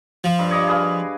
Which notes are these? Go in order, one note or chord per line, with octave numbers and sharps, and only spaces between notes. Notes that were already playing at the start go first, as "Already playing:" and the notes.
F3
G2
C#5 D#5 D6
G#4 B4 F5